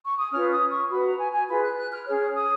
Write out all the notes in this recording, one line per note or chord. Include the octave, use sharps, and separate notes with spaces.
C#6
D#6
C#4 F4 B4 F6
D#6
C#6
F#4 B4 B5
A#5
G#5
G#5
F4 G#4 B4 B5
F#6
F#6
F6
C#4 G#4 C#5 F6
D#6